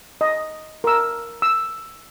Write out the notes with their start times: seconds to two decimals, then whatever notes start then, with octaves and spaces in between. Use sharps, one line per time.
0.21 D#5
0.84 A#4 E6
1.42 E6